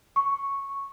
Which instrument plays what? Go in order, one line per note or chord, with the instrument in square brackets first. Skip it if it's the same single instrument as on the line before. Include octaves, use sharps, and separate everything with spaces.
[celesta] C#6